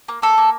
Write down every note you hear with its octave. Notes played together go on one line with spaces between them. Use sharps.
A#3
A#3 A4
A#3